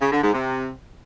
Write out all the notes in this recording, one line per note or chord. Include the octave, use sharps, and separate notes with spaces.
C#3
D3
G#2
C3